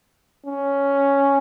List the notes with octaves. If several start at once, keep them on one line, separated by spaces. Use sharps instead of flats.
C#4